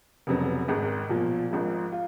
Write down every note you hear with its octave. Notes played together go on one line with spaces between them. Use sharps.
F1 F2 C#3 F#3 B3
G#1 G#2 D#3 G#3
B1 A#2 F3
G#1 G#2 F3
F4